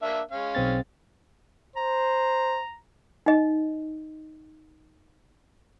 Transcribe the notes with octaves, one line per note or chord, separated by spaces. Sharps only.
A#3 D4 E5
G#3 C#4 F5
B1 C4 A6
C5 A#5
D#4 D#5